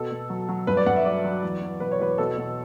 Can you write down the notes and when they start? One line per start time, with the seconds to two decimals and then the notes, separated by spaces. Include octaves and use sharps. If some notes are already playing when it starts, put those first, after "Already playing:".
Already playing: B2 A4
0.11 B2
0.29 F#3
0.49 F#3
0.67 G2 B4
0.77 D5
0.86 G2 F#5
0.96 E5
1.05 F#3 D5
1.24 F#3
1.43 E2
1.62 F#3
1.80 B2 B4
1.92 C#5
2.00 E2 B4
2.18 B2 A4
2.37 B2